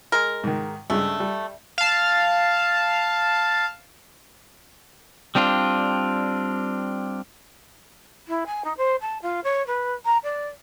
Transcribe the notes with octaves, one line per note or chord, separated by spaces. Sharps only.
G#3 A#4
G#2 D#3
G2 C#3 G#3 A3
G3
F5 A5
G3 C4 D4 F4
E4
G#5
D#4
C5
A5
F4
C#5
B4
A#5
D5